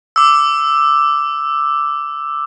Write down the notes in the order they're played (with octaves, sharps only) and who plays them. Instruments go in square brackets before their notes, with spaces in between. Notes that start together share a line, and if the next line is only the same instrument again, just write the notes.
[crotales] D6 E6